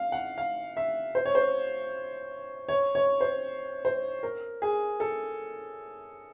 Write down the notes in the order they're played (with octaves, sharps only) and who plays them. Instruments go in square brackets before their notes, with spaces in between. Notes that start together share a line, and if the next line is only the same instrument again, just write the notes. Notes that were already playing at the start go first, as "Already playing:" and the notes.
Already playing: [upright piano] F5
F#5
F5
E5
C5
C#5
C5
C#5
C#5
C5
C5
A#4
G#4
A4